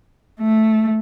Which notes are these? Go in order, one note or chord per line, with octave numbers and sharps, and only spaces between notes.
A3